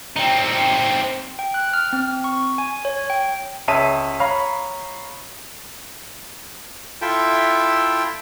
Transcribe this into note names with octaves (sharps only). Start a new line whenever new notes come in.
C4 D#4
G5
F#6
F6
C4
C#6
G#5
C#5
G5
C#2 C#5 E5 A5 D#6 D#7
C#5 F5 A#5 B5
E4 F4 A4 E5 G5